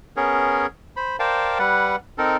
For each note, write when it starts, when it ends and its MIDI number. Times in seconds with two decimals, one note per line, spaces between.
0.17 0.66 59
0.17 0.66 61
0.17 0.66 68
0.17 0.66 70
0.17 0.66 73
0.97 1.17 72
0.97 1.17 83
1.19 1.58 70
1.19 1.58 72
1.19 1.58 74
1.19 1.58 77
1.19 1.58 79
1.19 1.58 81
1.59 1.96 55
1.59 1.96 71
1.59 1.96 78
2.18 2.37 60
2.18 2.37 63
2.18 2.37 69
2.18 2.37 70